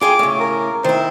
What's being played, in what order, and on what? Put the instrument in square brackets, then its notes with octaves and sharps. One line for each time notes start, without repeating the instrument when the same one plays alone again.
[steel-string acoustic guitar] F4 G#4 G5 [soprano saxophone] D6
[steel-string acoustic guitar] A2 C#3
[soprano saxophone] A#4
[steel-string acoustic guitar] D#3 E4 [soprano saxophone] C5